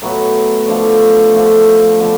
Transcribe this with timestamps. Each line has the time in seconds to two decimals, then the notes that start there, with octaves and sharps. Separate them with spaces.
0.02 A2 F#3 B3 F#4
0.68 D3 F3 A3
1.34 D3 F3 A3
2.00 D3 F3 B3